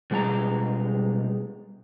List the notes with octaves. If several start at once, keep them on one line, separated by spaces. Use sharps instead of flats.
B2 G3 G#3 G#5 A#5